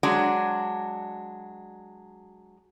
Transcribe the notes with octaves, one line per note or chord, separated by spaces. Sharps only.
F#3 G#3 D4 F#4